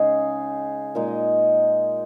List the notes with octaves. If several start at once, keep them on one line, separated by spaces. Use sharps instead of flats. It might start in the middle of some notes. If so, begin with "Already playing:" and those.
Already playing: C#3 G#3 D#4 G#4
A#2 G#3 D#4